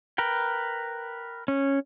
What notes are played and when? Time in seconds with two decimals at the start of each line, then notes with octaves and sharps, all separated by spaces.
0.18 A#4 B4 G5
1.48 C#4